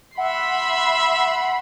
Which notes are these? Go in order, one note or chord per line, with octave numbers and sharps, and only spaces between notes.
E5 F#5 B5 C6